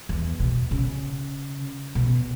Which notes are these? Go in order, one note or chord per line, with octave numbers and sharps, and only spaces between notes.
E2
B2
C#3
B2